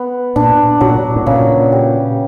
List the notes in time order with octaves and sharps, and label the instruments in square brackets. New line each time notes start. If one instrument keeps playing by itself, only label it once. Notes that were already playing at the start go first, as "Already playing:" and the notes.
Already playing: [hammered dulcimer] B3
[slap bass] A#2 [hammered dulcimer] D4
[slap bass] A#2 [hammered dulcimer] F#3
[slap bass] A2
[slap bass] A#2 [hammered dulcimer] C#3
[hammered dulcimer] G4